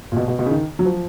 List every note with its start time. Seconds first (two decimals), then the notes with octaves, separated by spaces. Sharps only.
0.12 A#2
0.16 B2
0.28 B2
0.39 B2
0.46 C#3
0.51 D#3
0.79 F#3
0.85 F3